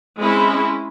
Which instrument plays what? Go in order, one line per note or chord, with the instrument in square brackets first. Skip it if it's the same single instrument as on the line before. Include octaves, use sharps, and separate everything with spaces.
[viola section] G#3 C4 C#4 E4